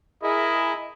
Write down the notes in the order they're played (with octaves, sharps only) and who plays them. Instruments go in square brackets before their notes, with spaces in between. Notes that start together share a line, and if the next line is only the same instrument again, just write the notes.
[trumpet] E4 [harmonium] G#4 A#4 [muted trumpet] D#5